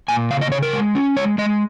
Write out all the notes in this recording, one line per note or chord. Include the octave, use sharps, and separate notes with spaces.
A#2 G#5
C#3 F5
D#5
C#3 C#5
A#4
G#3
C#4
G#3 C#5
G#3 D#5